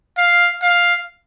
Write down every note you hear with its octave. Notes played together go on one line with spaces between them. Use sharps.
F5
F5